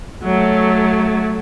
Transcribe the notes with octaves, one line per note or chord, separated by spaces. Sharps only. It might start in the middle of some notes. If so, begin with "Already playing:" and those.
F#3 A3